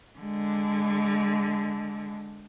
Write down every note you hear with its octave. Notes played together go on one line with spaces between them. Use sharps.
D3 G#3